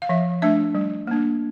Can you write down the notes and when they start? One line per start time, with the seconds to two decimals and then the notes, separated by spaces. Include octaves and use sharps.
0.02 F5
0.09 F3 E5
0.42 A3 D4 E5
0.75 G3
1.07 A#3 D4